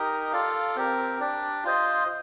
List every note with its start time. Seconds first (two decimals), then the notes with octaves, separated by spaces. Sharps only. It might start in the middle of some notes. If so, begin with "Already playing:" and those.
Already playing: D#4 G4 A#4 D#5
0.32 F4 A4 D5 F5
0.76 C4 G4 A#4
1.20 D4 G4 D5
1.64 F4 C5 D#5